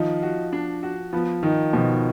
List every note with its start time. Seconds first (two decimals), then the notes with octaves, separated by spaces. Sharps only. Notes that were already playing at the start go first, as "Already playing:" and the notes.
Already playing: D#3 F3 D#4
0.23 F#4
0.52 D4
0.83 F#4
1.12 F3 B3
1.43 D#3 D#4
1.73 B2 F3